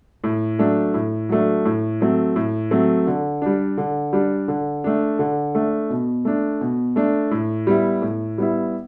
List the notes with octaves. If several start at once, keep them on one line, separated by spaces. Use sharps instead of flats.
A2
F#3 A3 D4
A2
F#3 A3 D4
A2
F#3 A3 C4
A2
F#3 A3 C4
D3
G3 D4
D3
G3 D4
D3
A3 D4
D3
A3 D4
B2
A3 D4
B2
A3 D4
A2
G3 B3 E4
A2
G3 B3 E4